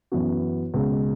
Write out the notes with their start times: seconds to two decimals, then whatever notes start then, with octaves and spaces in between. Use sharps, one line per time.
0.12 F#2 E3 B3 F#4
0.74 C#2 B2 G#3